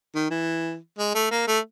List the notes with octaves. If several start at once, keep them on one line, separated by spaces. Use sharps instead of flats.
D#3
E3
G#3
A3
A#3
A3